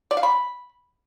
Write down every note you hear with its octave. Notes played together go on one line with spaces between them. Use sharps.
D5
F5
B5